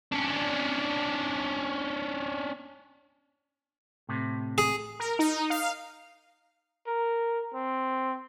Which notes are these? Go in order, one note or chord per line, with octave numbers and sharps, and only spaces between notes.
C#4 D4
A2 C3
G#4
A#4
D#4
F5
A#4
C4